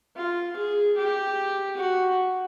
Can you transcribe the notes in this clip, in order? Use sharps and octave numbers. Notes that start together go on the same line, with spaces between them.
F4
G#4
G4
F#4